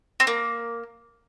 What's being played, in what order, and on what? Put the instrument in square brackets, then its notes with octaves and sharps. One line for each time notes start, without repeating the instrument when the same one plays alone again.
[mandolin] C4
A#3